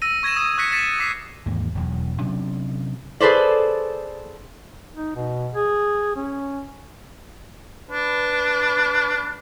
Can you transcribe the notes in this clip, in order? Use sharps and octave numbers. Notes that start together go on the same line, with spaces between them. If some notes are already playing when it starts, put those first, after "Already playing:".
E6 A#6 D#7
C#6 G#6 A#6 D#7 E7
D#6 A#6 D#7
C#6 F#6 A#6 B6 C#7
A6 B6 C#7 E7
D6 D#6 B6 C7
D#2 G#2 E3 A#3
E1 E2 F#3
C3 F#3 C#4 D4
G#4 A4 B4 C5 D5
D#4
B2
G#4
C#4
D4 B4